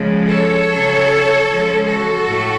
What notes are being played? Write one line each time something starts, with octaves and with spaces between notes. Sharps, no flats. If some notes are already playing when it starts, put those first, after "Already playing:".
Already playing: C#3 F3 G#3
A4 C#5
C#3 F#3
C#3 F3 G#3
F#4 A4
A2